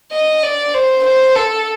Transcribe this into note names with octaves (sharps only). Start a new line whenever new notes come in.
D#5
D5
C5
C5
A4